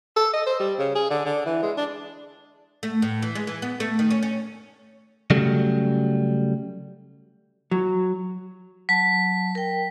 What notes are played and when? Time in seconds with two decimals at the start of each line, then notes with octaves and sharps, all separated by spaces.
0.16 A4
0.33 D#5
0.46 C5
0.60 G3
0.79 C#3
0.95 G#4
1.10 D3
1.25 D3
1.45 E3
1.63 G#3
1.77 D4
2.83 A3
3.02 A2
3.22 E3
3.35 G#3
3.47 E3
3.62 B3
3.80 A3
3.99 D#3
4.11 C#4
4.23 C#4
5.30 C#3 F#3 G3 A3
7.71 F#3
8.89 F#3 A5 B6
9.55 A#4 G5